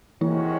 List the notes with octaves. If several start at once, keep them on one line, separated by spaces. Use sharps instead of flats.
C3 D#3 E3 G#3 C#4 E4 F#4